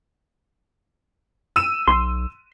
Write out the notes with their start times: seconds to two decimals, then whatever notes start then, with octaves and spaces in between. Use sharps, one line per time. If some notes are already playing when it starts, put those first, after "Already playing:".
1.56 E6 D#7 E7
1.88 B1 C6